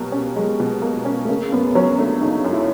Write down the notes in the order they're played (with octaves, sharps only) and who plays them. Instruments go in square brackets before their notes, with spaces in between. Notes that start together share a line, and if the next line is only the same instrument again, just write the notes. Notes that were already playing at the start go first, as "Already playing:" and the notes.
Already playing: [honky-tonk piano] B2 F#3 A#3 [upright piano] G3
[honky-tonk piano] C#4
[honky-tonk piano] F#3 [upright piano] G#3
[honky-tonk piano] B2
A#3
C#4
[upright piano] A3
[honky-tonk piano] C#3 [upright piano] A#3
[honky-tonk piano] F#2 [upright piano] B3
[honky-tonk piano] F#3 [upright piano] C#4
[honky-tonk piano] A3 [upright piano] D4
[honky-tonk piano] C#3 [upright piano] D#4
[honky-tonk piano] F#2
[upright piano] E4